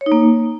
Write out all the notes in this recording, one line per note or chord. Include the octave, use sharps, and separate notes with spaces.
C#5
D#4
A#3